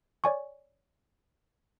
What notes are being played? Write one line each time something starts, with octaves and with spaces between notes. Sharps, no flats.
C#5 D5 G#5 C#6